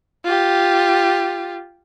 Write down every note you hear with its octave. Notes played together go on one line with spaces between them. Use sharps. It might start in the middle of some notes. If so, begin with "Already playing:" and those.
F4 G4